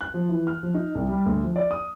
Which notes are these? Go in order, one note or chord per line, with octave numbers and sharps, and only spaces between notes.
F#6
F3
E3
F6
F3
D#4
C2
G3
D2
F3
D5
D#6